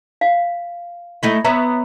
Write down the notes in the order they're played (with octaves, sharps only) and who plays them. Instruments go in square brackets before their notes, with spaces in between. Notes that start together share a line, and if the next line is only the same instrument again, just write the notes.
[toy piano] F5
[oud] A3 D#4 E4
[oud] B3 C#5 E5 [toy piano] A#5